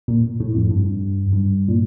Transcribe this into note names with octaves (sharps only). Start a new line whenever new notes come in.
A#2
A2
F2
G2
G2
A#2